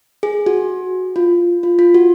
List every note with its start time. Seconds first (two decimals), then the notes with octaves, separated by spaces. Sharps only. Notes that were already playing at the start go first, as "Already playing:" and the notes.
0.23 G#4
0.46 F#4
1.16 F4
1.63 F4
1.79 F4
1.94 F#4